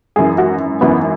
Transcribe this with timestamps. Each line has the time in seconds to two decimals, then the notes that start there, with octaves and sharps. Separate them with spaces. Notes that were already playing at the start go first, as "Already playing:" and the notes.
0.16 G#1 F#2 E3 G#4
0.38 F#4
0.81 G#1 F#2 E3 B3